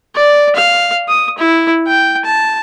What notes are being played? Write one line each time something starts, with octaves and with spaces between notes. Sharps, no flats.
D5
F5
D#6
E4
G5
A5